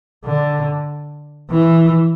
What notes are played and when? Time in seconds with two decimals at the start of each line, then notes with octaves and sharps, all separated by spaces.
0.25 D3
1.51 E3